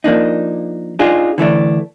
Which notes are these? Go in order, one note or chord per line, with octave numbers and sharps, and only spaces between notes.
F3 A#3 D4 D#4
D4 D#4 F4 G#4
D3 E3 A3 D4